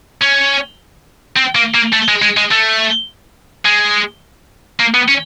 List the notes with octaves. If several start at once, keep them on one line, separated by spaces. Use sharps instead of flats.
C#4
C4
A#3
A#3
A3
G#3
G#3
G#3
A3
G#3
A#3
B3
C#4